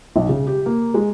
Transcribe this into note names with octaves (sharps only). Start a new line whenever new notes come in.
B1
C#3
G4
A#3
G#3